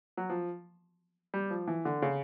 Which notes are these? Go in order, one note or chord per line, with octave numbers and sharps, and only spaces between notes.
F#3
F3
G3
F3
E3
D3
C#3